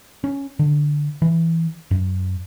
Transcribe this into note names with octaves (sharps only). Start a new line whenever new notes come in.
C#4
D3
E3
F#2